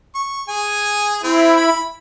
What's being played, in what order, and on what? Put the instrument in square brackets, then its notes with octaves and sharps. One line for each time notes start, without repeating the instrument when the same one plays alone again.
[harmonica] C#6
G#4 G#5
[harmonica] C4 [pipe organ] E4
[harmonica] B5